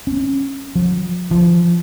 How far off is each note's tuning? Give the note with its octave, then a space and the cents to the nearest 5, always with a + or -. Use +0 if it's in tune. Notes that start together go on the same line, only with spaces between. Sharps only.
C#4 -20
F3 +45
F3 -15